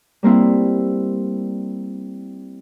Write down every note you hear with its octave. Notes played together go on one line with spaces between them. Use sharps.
G3 A#3 C4 E4